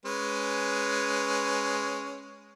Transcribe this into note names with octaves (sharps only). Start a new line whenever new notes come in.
G#3 C#4 B4